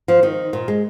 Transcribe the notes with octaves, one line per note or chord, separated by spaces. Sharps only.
F3
D#3
A#2
G#3